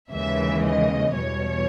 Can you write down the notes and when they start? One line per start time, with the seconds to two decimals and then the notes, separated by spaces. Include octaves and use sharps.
0.12 D#2 C#3 E3 G#3 E5
0.63 D#5
1.14 E2 B2 G3 C#5